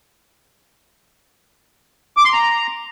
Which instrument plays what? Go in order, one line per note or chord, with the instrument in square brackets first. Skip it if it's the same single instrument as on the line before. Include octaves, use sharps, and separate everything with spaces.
[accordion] D6
C6
A#5